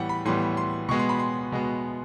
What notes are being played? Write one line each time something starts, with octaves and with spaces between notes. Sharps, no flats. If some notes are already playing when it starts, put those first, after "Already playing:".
Already playing: A2 E3 G3 B3 F#5 G5
B5
A2 E3 G3 B3 C6
C6
B2 G#3 B3 C#6
C6
B5
C6
B2 G#3 B3